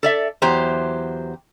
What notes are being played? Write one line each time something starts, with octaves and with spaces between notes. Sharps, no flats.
A4 D5 E5
E2 F#3 G4 C5 A#5